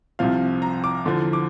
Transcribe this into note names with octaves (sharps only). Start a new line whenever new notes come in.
C2 C3 F3 F5
A#5
D6
E2 D3 F3
D6